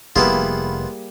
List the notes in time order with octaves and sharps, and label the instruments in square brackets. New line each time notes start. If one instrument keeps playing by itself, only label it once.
[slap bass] F1 [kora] G3 A#3 G#4 [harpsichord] B3 E4 F4